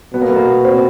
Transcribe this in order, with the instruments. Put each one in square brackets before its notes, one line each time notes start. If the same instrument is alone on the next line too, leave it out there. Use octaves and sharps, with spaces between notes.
[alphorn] B2 [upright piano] B3
[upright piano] A#3
A3
A#3
C4